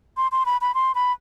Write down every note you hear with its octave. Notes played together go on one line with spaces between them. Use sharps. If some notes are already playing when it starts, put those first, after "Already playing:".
C6
C6
B5
B5
C6
B5